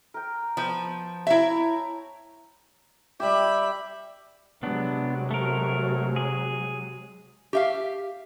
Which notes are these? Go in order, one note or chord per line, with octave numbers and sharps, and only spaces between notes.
A#4 G5
F3 B3 G5
E4 C#5 E5 A5 A#5
G3 G4 E5 B5
C3 F#3 G#3 B3 D4
A3 A#4
G#4
G4 E5 F5